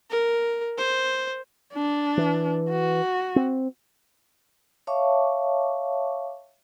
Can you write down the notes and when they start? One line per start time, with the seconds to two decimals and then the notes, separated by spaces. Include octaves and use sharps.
0.10 A#4
0.77 C5
1.74 D4
2.17 E3
2.69 F#4
3.36 C4
4.87 C#5 E5 F5 A5 C#6 D6